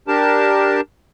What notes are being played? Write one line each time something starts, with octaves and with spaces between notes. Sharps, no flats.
D4 G4 A#4 A5